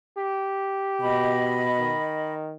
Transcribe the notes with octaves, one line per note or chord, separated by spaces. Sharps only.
G4
B2 D#5 B5
D#3